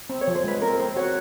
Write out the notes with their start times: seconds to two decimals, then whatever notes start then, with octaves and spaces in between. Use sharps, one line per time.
0.10 C4
0.21 C#5
0.28 F3
0.35 C5
0.44 G#3 B4
0.62 C4 A#4
0.79 C4 C5
0.96 F#4 C#5